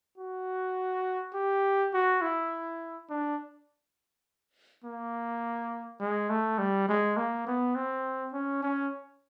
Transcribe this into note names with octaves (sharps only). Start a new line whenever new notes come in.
F#4
G4
F#4
E4
D4
A#3
G#3
A3
G3
G#3
A#3
B3
C4
C#4
C#4